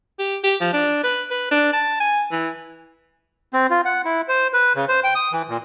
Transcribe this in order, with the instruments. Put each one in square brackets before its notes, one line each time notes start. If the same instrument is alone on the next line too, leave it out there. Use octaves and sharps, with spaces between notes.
[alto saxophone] G4
G4
F3
D4
B4
B4
D4
A5
G#5
E3
[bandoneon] C4
F4
F#5
E4
C5
B4
C#3
C5
G5
D#6
E3
A#2